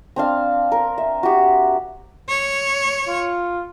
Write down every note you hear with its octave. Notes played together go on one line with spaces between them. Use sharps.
C4 D4 F5
A#4
E5
F#4 G4
C#5
F4